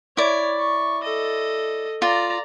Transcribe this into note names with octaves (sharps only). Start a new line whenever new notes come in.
E4 C#5 D5
C#6
A4 D#5
F4 D5 A#5